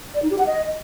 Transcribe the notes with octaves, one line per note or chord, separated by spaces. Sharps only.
D5
D#4
G4
F#5
D#5